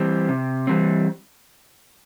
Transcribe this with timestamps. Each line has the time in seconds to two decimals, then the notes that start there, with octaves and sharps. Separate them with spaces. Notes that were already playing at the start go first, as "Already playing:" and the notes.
Already playing: E3 G3 C4
0.29 C3
0.67 E3 G3 C4